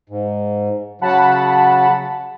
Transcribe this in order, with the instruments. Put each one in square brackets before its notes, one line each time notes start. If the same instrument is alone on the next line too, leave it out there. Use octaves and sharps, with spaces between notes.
[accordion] G#2
[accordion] C#3 F#3 [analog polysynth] F#5 A5 B5